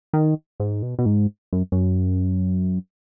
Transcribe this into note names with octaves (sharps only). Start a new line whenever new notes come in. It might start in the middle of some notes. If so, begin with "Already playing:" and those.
D#3
G#2
B2
B2
G#2
F#2
F#2